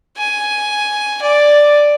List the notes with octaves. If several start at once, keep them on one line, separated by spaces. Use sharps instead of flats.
G#5
D5